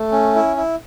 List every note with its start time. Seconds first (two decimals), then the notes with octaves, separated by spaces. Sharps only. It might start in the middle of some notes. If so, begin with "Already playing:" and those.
Already playing: A3
0.12 C#4
0.35 E4
0.57 E4